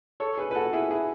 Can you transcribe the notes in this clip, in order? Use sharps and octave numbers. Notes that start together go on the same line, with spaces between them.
A4 C#5
G#4 B4
B4
F#4 A4
E4 G#4
E4 G#4